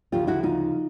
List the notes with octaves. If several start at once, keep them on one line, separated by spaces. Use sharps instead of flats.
D2 C#3 F3 F4 G4
E4 F#4
D#4 F4